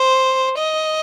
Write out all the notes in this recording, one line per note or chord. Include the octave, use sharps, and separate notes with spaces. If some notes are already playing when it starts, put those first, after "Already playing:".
Already playing: C5
D#5